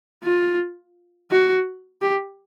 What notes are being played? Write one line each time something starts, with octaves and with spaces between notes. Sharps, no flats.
F4
F#4
G4